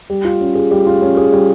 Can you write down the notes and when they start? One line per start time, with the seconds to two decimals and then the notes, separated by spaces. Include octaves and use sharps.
0.10 G3
0.25 F4
0.41 C#4
0.55 G#4
0.71 G3
0.87 F4
1.02 C#4
1.17 G#4
1.32 G3